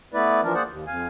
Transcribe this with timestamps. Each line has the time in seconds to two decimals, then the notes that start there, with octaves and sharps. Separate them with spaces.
0.14 A3 B3 E4 B4 D5
0.43 E3 F3 D4 A#4
0.54 A#3 G#4 C5 D5 F#5
0.68 D#2
0.87 F2 F5 G#5